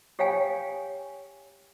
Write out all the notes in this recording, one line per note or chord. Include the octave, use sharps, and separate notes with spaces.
G4 C#5 F5 G5 G#5